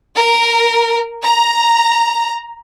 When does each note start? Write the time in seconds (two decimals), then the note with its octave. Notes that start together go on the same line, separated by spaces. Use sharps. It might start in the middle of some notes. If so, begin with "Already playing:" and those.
0.17 A#4
1.23 A#5